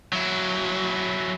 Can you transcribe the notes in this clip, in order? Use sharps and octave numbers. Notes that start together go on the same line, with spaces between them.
F#3 E4